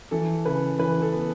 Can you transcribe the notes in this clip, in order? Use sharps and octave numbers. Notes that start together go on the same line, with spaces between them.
E3 A4
C#3 B4
E3 B4
A4
B3